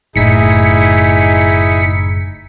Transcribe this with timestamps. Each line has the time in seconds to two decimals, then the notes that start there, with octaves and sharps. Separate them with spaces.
0.16 F#1 A2 D#4 E4 G#4 B6 C#7